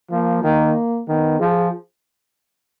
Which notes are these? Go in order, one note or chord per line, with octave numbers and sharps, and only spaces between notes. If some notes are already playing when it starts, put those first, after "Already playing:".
F3 A#3
D#3 A#3
D#3 B3
F3 G#4